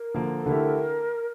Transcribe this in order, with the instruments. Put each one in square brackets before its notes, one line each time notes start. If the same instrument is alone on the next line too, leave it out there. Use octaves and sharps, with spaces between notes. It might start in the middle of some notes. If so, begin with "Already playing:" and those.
Already playing: [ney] A#4
[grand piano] D3 F3 A#3
[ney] A4
[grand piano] D3 A3 E4 G4 [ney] A#4